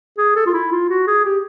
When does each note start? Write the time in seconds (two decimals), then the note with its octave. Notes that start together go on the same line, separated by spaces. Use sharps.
0.18 G#4
0.36 A4
0.46 F4
0.53 E4
0.72 F4
0.90 F#4
1.07 G#4
1.25 G4